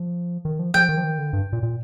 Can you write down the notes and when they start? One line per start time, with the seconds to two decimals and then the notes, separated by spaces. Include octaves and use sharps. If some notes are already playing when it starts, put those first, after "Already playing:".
Already playing: F3
0.45 D#3
0.59 F3
0.74 F3 G5
0.89 D#3
0.97 F3
1.04 D#3
1.18 D3
1.33 G2
1.53 A#2
1.63 A#2